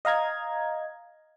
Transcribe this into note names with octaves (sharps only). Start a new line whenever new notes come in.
D#5 F5 A#5 G#6